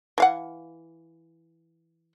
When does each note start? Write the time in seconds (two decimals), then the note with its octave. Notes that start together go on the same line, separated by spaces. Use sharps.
0.18 E3 F5 F#5